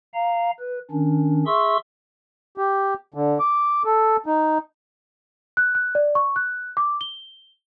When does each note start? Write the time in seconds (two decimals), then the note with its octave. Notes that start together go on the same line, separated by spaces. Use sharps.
0.14 F5 A#5
0.60 B4
0.91 D#3 C#4 D4
1.46 G#4 E5 C6 C#6 E6
2.58 G4
3.14 D3
3.40 D6
3.85 A4
4.26 D#4
5.57 F#6
5.75 F#6
5.95 D5
6.15 C#6
6.36 F#6
6.77 D6
7.01 G7